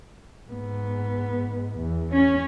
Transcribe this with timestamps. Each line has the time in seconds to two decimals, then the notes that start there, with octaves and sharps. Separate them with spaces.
0.50 G#2 B3
1.79 E2
2.14 C#4